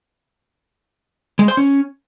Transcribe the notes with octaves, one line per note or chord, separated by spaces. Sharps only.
G#3
C5
C#4